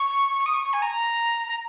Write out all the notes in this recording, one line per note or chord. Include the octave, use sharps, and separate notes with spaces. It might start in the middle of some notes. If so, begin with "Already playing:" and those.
Already playing: C#6
C#6
D#6
C#6
C#6
G#5
A#5
A#5